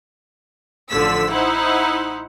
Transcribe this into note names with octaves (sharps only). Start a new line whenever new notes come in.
A1 D3 F3 E6 B6
D#4 E4 C5 F#5